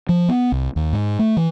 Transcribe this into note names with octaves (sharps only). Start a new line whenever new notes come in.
F3
B3
C2
D#2
G#2
A3
E3